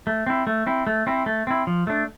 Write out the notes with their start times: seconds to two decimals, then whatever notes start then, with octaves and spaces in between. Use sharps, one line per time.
0.07 A3
0.27 C4 E4
0.47 A3
0.66 C4 E4
0.87 A3
1.07 C4 E4
1.26 A3
1.47 C4 E4
1.67 F3
1.87 A3 D4